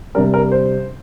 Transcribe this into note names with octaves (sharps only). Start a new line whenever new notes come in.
C3 G3 D4 A#4
A#4
C5